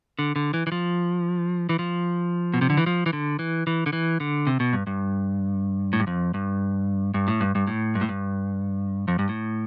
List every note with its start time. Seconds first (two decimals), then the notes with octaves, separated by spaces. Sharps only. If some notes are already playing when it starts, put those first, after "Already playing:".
0.19 D3
0.36 D3
0.54 E3
0.67 E3
0.72 F3
1.69 E3
1.79 F3
2.54 B2
2.61 C3
2.70 D3
2.77 E3
2.86 F3
3.06 E3
3.13 D3
3.39 E3
3.67 E3
3.86 D3
3.93 E3
4.20 D3
4.47 C3
4.60 B2
4.73 G2
4.87 G2
5.93 A2
6.00 G2
6.07 F2
6.34 G2
7.14 G2
7.28 A2
7.41 G2
7.55 G2
7.67 A2
7.95 G2
8.01 A2
8.09 G2
9.08 F2
9.19 G2
9.29 A2